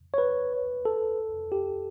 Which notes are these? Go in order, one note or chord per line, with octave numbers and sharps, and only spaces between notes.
C#5
B4
A4
G4